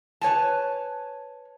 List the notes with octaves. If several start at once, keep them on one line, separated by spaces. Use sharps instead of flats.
B4 C#5 G#5 A5